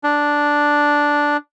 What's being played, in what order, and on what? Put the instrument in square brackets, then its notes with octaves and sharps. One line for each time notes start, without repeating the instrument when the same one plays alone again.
[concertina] D4